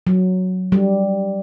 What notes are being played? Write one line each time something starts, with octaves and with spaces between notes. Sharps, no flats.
F#3
G3